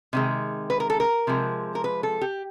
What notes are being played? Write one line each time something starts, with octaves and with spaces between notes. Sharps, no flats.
C3 D#3 G#3
B4
A#4
A4
A#4
C3 F3 G#3
A#4
B4
A4
G4